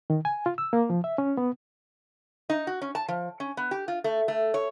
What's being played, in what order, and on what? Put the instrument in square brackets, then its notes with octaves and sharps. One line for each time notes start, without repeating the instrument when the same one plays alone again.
[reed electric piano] D#3
G#5
F4
E6
A#3
F3
E5
C#4
B3
[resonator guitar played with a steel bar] D#4
F#4
C#4
A5
F3
C#4
B3
G4
F4
A3
A3
C#5